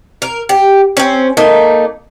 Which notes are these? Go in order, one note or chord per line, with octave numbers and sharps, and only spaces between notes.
A#4
G4
C4 C#4
A3 A#3 D#4